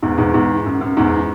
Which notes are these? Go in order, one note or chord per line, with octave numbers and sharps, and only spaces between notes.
E2 G#2
E2 G#2
E2 G#2
F#2
F#2
E2 G#2